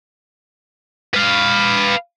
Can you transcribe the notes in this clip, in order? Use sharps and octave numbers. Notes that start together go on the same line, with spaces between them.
B4 F5